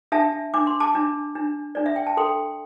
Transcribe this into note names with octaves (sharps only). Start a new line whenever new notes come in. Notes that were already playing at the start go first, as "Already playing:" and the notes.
D4 E5 A5
D4 D6
C6
A5 D6
D4
D4
D4 D5
E5
G5
A5
A4 G5 C6